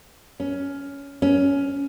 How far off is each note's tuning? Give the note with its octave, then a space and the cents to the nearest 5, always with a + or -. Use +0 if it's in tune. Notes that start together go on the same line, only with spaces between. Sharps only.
C#4 +15
C#4 +15